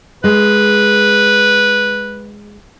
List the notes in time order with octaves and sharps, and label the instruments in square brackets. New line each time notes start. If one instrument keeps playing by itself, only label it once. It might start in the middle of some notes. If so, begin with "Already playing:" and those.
[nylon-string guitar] G#3 [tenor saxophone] B4